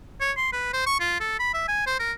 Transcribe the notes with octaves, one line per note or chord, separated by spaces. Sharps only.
C#5
C6
B4
C5
C#6
F4
A4
B5
E5
G#5
C5
A#4